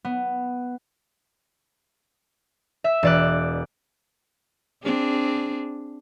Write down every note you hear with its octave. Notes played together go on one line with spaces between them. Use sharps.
B3
E5
E1 D5 F#6
C4 D4 G#4